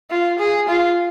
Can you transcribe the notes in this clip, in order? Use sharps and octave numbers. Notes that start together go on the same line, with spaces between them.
F4
G#4
F4